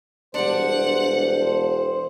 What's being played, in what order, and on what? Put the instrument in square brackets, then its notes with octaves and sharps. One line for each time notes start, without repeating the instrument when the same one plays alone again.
[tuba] E1 [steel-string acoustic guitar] G3 D4 [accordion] C5 [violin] F#5